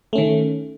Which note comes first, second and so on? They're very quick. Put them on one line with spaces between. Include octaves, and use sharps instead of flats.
A3 C#4 D#3